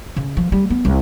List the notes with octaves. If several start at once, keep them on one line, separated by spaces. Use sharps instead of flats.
C#3
F3
G3
B3
C2